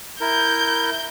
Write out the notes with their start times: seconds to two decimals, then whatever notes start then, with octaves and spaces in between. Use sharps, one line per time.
0.21 E4 A#4 G6